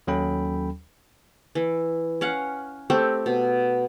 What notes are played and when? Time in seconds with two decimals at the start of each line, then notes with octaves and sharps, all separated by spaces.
0.07 D#2 F#3 C#4 A4 G5 B5
1.55 E3
2.21 C#4 F5 F#5
2.90 A3 C4 G4
3.26 B2